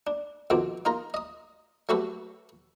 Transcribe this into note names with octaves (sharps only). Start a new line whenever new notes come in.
D4
F2 B2 D#3 C4 D6
D#4 F4 A#4 A#5
D#5 D#6
F#3 A3 F#4 G4 A4 B4